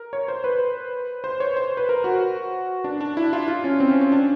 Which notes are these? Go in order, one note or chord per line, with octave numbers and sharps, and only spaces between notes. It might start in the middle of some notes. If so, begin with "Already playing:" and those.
Already playing: A#4
C#5
C5
B4
C5
C#5
C5
B4
A#4
F#4
D4
D4
E4
F4
F4
C#4
C4
C#4
C#4
D4